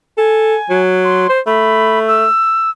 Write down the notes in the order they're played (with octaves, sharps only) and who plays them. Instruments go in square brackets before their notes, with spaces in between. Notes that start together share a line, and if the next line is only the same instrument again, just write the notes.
[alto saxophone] A4 [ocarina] G#5
[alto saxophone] F#3
[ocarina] C6
[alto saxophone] C5
[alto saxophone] A3 [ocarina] B5
[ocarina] E6